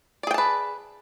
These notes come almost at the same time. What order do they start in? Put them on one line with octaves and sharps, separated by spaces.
D5 G#4 G5 A5 B4